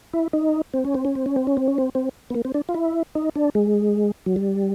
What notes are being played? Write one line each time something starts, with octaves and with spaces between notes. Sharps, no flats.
E4
D#4
C4
C#4
C4
C#4
C4
C#4
C4
C#4
C4
C#4
C4
C4
B3
A#3
C4
D4
F4
E4
D#4
D4
G#3
F#3
G3